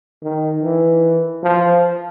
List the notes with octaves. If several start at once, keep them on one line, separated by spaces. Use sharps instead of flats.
D#3
E3
F3